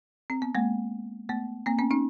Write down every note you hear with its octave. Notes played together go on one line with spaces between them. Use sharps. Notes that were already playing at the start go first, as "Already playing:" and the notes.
C4
B3
G#3 A#3
A3 B3
A#3 C4
B3 C#4
C#4 D#4